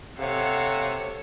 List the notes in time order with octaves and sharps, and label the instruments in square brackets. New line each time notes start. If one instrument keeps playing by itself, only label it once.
[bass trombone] C3 [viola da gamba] A4 C#5 [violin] F5 F#5